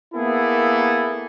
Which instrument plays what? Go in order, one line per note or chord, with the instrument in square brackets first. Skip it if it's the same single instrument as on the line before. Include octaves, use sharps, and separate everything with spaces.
[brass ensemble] A#3 B3 E4 G#4 A4